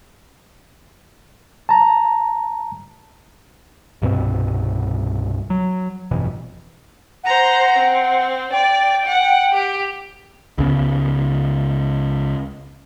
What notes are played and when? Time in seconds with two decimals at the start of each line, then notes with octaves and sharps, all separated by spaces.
1.69 A5 A#5
4.02 C2 G2 B2 C4
5.50 F#3
6.11 G1 F2 B2 E3
7.24 C5 F#5 A#5
7.78 C4
8.52 D5 G5
9.06 F#5
9.51 G4
10.58 C#2 C#3 B3